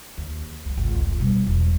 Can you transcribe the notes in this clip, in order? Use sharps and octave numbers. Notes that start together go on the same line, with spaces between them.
D#2
C#2 F3
G#1 C#2
F1 F2
B2 G3
E1 B1